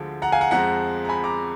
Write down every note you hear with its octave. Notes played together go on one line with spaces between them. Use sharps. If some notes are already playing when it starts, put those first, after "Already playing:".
Already playing: D2 D3 F3 G#3
F#5 A#5
F5 G#5
F#5 A#5
F2 F3 G#3 F#5 A#5
A#5
G#5 B5
A#5 D6